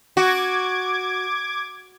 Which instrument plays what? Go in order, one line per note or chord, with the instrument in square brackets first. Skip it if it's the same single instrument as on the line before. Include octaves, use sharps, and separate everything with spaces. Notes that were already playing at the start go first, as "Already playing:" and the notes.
[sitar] F#4 [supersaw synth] D6 G#6